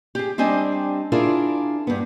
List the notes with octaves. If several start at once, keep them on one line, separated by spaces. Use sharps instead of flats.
G4 G#4
G3 C4 D4 G4 D#5 G#5
D4 E4 F4 G#4 A#4
G2 B3